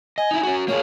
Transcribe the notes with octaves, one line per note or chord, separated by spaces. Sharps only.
D#5 G#5
D#4 E4
C#4 F#4
A#3 F4 G#4 C#5